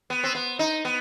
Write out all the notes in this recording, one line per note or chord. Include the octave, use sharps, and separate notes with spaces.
B3
C4
B3
D#4
B3